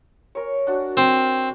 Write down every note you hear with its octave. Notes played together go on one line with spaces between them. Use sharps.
A#4 C#5
D4 F#4
C4